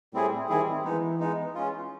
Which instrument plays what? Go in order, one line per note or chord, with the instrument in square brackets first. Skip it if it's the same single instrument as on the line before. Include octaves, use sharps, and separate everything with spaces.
[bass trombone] A2 [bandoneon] G3 C4 E4 G#4
[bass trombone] D#3 [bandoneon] G3 C4 E4 G#4
[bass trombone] E3 [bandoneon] G#3 B3 D#4
[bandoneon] G#3 B3 D#4
G#3 C#4 F4